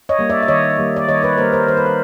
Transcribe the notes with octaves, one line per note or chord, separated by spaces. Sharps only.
C#5 D#5
G3 A#3
D5 E5
E5
D#3 C#5 D#5
G3 A#3
D5
D#3 C#5 D#5
B4 C#5
G3 A#3 A#4 C5
A#4 C5
D#3 C5
B4
A#4